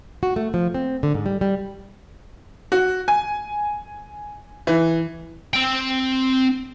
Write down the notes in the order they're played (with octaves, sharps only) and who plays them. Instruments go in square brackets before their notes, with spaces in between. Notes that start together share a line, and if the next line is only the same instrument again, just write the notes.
[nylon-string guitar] F#4
A3
F3
C4
D3
G#2
G3
G3
[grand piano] F#4
G#5
E3
[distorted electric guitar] C4 G5